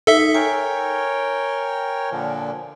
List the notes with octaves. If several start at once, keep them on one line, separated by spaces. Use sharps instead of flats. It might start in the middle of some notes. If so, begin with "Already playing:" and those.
D#4 A4 E5
A#4 C#5 G5 G#5
A#2 D3 F3